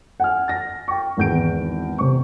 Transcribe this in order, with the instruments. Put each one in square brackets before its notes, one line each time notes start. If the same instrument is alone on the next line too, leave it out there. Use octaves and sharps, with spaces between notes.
[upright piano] F#5 G#5 F6
A6 A#6
G5 C#6
G#1 E2 G6 D7
C3 C#6